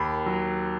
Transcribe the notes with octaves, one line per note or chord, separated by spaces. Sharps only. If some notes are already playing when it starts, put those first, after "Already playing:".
Already playing: D#2 B5
F#3